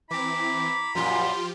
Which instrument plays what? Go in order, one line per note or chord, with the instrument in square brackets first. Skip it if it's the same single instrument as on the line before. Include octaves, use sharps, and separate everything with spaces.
[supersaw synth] E3 C4 [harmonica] E4 A#5 B5 [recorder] D6
[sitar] F#2 A#2 [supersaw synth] F3 F4 G4 [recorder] C6